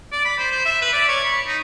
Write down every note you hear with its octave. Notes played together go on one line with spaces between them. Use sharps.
D5
B5
C5
C5
E5
B4
D5
C#5
B5
D#4